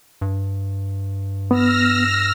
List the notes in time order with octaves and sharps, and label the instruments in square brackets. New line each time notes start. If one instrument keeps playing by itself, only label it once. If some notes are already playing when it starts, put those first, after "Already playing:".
[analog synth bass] G2
[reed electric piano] B3 [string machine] E6 F6 A#6